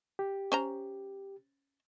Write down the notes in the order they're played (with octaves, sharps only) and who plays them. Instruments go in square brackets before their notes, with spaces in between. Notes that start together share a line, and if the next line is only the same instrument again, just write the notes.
[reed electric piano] G4
[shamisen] C#4 C5 A#5